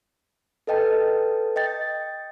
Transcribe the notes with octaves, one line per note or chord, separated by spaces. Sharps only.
A4 B4 D#5 G5 A5
D#5 G5 A6